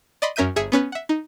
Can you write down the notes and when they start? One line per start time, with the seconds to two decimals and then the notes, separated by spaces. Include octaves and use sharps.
0.22 D5 D#5 B5 C6
0.36 F#2 C#4 A#4 E5 G6 D#7
0.56 G1 G#4 E5 C#7
0.72 B3 C#4 B4
0.92 E5 F#5
1.09 D#4